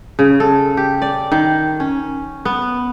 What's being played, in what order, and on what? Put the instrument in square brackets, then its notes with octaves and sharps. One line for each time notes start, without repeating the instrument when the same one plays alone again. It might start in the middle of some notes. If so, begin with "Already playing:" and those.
[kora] C#3
A4
G4
D5
D#3
C#4
B3